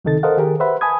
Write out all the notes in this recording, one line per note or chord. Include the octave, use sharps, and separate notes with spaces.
C#2 C3 D#3 D#4 A4 A6
A4 A#4 C5 D#5 F5 F#5
D#3 G4 G#4 A#4
B4 C5 E5 F#5 B5
G#5 A5 B5 D#6 G#6